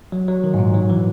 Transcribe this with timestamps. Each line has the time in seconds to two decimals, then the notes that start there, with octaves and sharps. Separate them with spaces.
0.12 F#3
0.28 F#3
0.44 D#3
0.54 G#2
0.59 A#2
0.74 F#3
0.90 E3